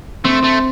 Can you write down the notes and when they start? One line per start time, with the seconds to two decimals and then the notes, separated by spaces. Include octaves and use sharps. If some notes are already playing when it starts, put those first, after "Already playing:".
0.24 A3 C4
0.44 A3